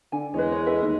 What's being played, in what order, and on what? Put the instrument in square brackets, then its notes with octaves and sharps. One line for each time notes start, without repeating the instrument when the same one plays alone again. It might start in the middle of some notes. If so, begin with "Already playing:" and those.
[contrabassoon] D3 [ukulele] G#5
[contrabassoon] E2 [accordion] G#3 [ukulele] B4 C#5
[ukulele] C#5
A4 B4 E5
[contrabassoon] D#2